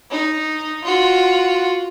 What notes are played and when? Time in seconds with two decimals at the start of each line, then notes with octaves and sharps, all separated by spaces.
0.11 D#4
0.84 F4 F#4